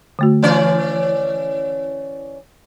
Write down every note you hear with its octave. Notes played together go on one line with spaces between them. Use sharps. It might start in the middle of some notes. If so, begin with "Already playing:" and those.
D3 A3 F#4
E3 C#4 D5